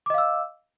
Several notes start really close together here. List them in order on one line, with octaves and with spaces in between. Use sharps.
D6 D#5 F5 E6